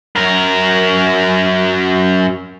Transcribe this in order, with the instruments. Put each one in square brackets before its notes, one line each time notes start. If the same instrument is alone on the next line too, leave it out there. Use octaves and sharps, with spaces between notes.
[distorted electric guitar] F#2 A#4